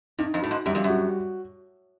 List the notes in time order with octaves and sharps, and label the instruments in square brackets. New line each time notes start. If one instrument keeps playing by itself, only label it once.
[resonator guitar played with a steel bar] G2 [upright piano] D#4
[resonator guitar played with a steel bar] F2
[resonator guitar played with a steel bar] A2 [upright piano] F#4
[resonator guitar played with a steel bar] G#2
[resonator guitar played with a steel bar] F#2 [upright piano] G3
[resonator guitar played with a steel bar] F2
F#2
[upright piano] F#4